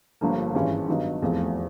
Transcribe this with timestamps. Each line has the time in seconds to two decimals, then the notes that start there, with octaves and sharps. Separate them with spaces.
0.21 G1 G2 D3 F3 A#3
0.54 G#1 G2 E3 G#3 C#4
0.88 G2 D#3 F#3 B3 D#4
1.21 F1 E2 C3 F3 A3